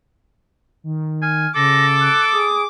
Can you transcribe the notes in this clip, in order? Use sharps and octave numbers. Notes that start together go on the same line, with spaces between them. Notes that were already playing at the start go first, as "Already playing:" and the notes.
D#3
G#5 F6
C#3 A4 D6 A#6
F#6
G#4 D#6